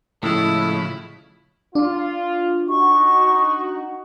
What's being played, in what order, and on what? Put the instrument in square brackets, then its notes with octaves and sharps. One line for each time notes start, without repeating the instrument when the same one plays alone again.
[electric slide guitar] A2 G#3 [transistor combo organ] C#3 F3 B5 [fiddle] E4 [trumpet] A4
[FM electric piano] D4 [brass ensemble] F4
[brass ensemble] D#4 F#4 [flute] C#6